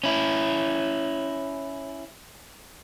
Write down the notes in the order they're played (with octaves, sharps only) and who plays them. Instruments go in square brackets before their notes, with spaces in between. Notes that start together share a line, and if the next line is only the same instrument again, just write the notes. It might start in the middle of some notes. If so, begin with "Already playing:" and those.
[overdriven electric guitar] C#4 E4